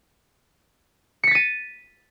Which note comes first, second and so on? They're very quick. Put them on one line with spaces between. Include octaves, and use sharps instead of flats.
C#7 B6 A6 D#7